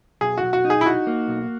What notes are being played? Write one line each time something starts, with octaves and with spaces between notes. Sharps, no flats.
B1 G#4
F#4
B1
F#4
D#4
G#4
E4
D#4 F#4
A#3
B1